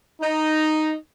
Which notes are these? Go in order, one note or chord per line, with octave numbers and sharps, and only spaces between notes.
D#4